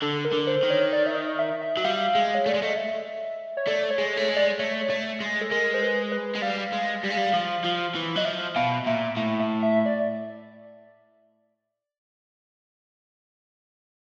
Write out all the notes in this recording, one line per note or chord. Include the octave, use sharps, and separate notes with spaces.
D3 A4
A#4
D3
C5
D#3
C#5
D5
E5
D#5
E5
E5
F#3
G3 F5
G#3
C#5
A3 D5
G#3
A3 D#5
E5
C#5
A3 D5
C#5
G#3
A3 C#5
G#3
D5
A3 C#5
A3
G#3
A4
G#3 A#4
C5
B4
B4
G#3
G3 F5
G#3
G3
G#3
G3
F3
F3
E3
F#3 D#5
F3 E5
B2 F5
A#2 E5
A2 E5
E5
E5
D5